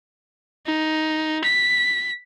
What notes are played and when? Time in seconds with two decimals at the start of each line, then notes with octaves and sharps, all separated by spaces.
0.66 D#4
1.44 B6